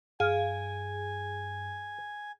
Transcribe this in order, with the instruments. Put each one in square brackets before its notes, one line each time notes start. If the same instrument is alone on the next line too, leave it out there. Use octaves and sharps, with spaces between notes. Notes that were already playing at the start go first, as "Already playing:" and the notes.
[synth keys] G2 [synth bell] G#4 [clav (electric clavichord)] F5 [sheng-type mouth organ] G#5